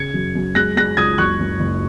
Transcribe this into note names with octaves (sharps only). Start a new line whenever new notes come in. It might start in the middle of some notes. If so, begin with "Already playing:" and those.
Already playing: C#3 G#6 C#7
F#2
F#2
G#3 F#6 A#6
G#3 F#6 A#6
C#2 D#6 G#6
F#1 C#6 F#6
F#2
F#1